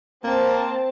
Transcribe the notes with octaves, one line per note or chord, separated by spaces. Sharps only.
A#3 C4 A5